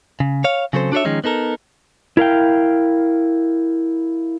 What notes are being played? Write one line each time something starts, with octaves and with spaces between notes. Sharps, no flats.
C#3
C#5 F5
C#3 F#3 C4 A4 C5
D4 F#4 A4 C5 C#5 E5
D#3 F3 G#3 C#4 D#4
B3 D#4 A4 A#4
E4 A#4 F5 G5